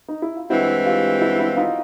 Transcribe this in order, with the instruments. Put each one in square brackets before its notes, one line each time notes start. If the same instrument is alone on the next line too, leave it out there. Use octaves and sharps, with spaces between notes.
[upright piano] D#4
E4
F4
[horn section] G2 E3 G#3 C4 [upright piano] E4 F#4
[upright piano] F4 G4
E4 F#4
E4 F#4
D#4 F4